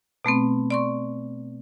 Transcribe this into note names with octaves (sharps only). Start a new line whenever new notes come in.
B2 A3 B3 C4
D5 C6 C#6